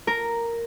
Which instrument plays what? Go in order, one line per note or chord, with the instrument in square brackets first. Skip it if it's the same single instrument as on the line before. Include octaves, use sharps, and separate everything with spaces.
[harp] A#4